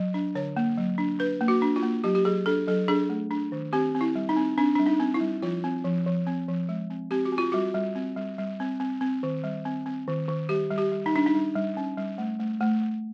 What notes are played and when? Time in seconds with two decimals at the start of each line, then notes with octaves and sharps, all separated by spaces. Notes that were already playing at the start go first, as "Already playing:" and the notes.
Already playing: F#3
0.14 D4
0.35 D3 C#5
0.56 A#3
0.77 F#3
0.98 D4
1.19 D4 B4
1.41 A#3
1.48 F#4
1.62 D4
1.76 F4
1.83 A#3
2.04 F#3 G4
2.15 G4
2.25 F#3 G#4
2.46 D4 A4
2.67 F#3 A4
2.88 D4 G#4
3.09 A3
3.31 D4
3.52 D#3
3.73 C4 G4
3.95 C4
4.01 E4
4.15 G3
4.29 D#4
4.36 C4
4.58 C4 D4
4.75 G3 D4
4.86 D#4
5.00 C4
5.14 E4
5.21 G3
5.42 F3 F4
5.64 C4
5.84 F3
6.06 F3
6.27 C4
6.48 F3
6.69 G#3
6.90 C4
7.11 C4 G4
7.25 F#4
7.32 C4
7.38 F4
7.52 G3 F#4
7.74 G3
7.95 C4
8.17 G3
8.38 G3
8.60 C4
8.80 C4
9.01 C4
9.23 D#3
9.44 G3
9.65 C4
9.86 C4
10.08 D#3
10.28 D#3
10.49 G3 G4
10.71 G3
10.78 G4
10.92 G3
11.06 D#4
11.12 G3 D4
11.26 D#4
11.35 G3
11.56 G3
11.77 C#4
11.97 G3
12.18 A3
12.40 A3
12.60 A3
12.82 A3